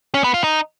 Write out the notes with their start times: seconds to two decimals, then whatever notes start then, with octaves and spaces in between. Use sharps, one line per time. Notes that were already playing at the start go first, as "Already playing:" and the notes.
0.14 C#4
0.24 B3
0.34 F4
0.44 D#4